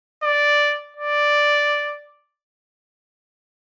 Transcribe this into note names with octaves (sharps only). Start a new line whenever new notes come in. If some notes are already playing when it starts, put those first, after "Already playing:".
D5
D5